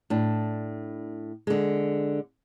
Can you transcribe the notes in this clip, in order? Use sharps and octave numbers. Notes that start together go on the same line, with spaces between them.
A2 D4
D3 G#3